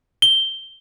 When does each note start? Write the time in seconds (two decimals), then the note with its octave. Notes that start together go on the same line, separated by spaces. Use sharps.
0.22 G7